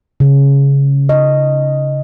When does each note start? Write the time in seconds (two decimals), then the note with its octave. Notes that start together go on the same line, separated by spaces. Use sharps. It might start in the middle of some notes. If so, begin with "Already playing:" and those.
0.20 C#3
1.09 D#5